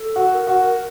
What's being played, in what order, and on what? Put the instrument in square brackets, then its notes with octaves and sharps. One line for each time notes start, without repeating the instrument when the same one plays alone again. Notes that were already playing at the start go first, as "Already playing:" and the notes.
Already playing: [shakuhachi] A4
[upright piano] F#4
[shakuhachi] A#4
[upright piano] F#4